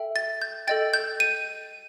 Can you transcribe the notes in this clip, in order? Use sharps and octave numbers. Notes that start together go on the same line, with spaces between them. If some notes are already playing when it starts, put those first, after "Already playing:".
Already playing: A4 E5 G5
A6
G6
A4 D#5 G5 A6
G6
D#7